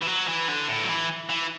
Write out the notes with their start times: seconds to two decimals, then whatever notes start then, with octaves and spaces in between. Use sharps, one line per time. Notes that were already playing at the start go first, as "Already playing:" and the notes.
0.02 E3
0.07 F#3
0.28 E3
0.48 D3
0.68 A2
0.84 F#3
0.89 E3
1.30 E3